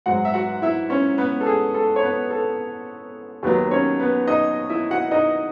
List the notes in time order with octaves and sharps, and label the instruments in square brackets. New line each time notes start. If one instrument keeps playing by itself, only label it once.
[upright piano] G#2 F#3 F#4 F#5
E5
F#4 F#5
E4 E5
C#4 C#5
B3 B4
A4
G#4
A4
C#5
B3 B4
A4
D#2 D#3 F#3 B3 B4
C#4 C#5
B3 B4
D#4 D#5
E4 E5
F#4 F#5
D#4 D#5